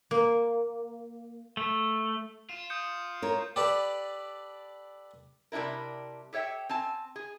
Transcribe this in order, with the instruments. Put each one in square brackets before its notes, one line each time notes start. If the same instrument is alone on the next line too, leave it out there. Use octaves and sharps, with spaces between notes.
[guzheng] A#3
[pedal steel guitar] A3
[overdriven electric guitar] F4 [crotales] E7
[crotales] D#6 G6 C#7
[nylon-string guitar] A#4 C#5
[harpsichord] G4 A4 B4 D5
[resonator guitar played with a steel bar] C3 G3 D4 E4 A#4
G4 A4 C#5 E5 G5
C4 G#5 A5
G#4